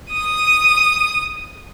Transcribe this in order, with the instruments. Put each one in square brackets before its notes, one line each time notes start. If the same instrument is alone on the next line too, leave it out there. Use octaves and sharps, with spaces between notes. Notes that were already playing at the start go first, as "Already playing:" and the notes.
[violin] D#6 D#7